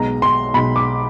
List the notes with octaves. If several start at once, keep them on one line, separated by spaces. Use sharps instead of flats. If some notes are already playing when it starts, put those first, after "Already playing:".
Already playing: B1 B2 G#3 A#5
C6
B1 B2 G#3 B5
D6